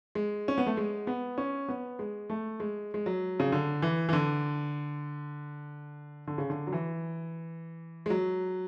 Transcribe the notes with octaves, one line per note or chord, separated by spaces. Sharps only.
G#3
C#4
B3
A3
G#3
B3
C#4
B3
G#3
A3
G#3
G#3
F#3
C#3
D3
E3
E3
D3
D3
C#3
D3
F#3
E3
G#3
F#3